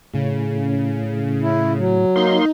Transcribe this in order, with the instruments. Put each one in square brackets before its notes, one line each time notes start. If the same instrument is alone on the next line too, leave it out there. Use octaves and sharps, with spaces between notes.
[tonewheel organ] A2 [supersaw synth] C#3
[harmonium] E4
F#3
[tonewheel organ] A#3 C6 [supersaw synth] D#4